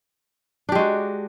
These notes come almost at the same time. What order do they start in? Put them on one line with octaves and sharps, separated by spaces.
D4 G4 G#3 F#4